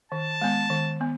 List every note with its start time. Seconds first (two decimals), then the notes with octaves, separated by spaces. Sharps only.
0.12 D#3 A5
0.41 G#3 B3
0.70 D#3
1.01 B3